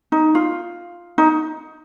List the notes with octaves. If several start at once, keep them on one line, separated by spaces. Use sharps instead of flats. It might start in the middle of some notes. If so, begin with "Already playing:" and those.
D#4
F4
D#4